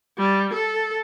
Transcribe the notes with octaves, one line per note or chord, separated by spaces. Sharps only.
G3
A4